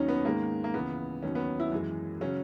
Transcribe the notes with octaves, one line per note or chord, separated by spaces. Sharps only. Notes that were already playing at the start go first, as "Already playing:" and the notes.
Already playing: D#2 D#3 F#3 C#4 D#4
B3
G#2 D#3 G#3 A#3
A#3
C#2 C#3 E3 B3
D#2 D#3 F#3 C#4
B3
E4
F#2 E3 G#3
C#3 F#3 C#4